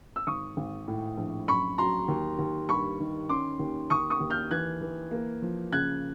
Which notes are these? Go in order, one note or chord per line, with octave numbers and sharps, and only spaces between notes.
E6
G#1 C#6 D#6
G#1
A2
A#1
F#2 B5 C#6
F#3 A#5 C6
D#2
D#2
G2 B5 C#6
D#3
C#4 C6 D6
D#2
D#2 C#6 D#6
C#6 D#6
D#2
F6 G6
E3 F#6 G#6
E3
A#3
F3
C#3 F#6 G#6